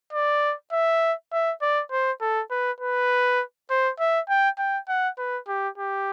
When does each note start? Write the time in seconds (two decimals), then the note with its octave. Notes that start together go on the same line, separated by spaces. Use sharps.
0.13 D5
0.72 E5
1.32 E5
1.62 D5
1.91 C5
2.21 A4
2.51 B4
2.80 B4
3.70 C5
3.99 E5
4.29 G5
4.58 G5
4.88 F#5
5.18 B4
5.48 G4
5.78 G4